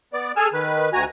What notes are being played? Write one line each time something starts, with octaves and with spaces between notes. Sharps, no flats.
B3 D5
G#4 A4 G#5 E6 F6
D#3 B4
D2 F#4 G#5 A#5